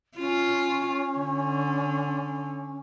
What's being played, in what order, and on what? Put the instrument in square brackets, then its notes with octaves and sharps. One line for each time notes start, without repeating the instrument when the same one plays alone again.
[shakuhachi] C#4 [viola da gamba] F4
[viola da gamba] D3